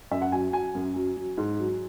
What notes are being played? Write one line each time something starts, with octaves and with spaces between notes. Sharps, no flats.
F#2 E5
F#5
F#3 G#5
F#3 G#5
F#2
F#3
F#3
G#2
F#3